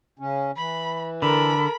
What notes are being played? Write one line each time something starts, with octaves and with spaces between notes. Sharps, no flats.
C#3 C#4
E3 B5
D3 A4 A#4 B5